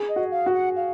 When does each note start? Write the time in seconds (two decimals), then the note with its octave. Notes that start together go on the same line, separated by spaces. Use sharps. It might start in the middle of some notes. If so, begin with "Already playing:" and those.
Already playing: G#4
0.09 D#5
0.16 F#4
0.31 F5
0.46 F#4
0.54 F#5
0.76 F5